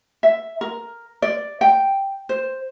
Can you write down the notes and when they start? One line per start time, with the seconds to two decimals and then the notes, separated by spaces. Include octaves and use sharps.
0.23 E5
0.61 A#4
1.22 D5
1.61 G5
2.29 C5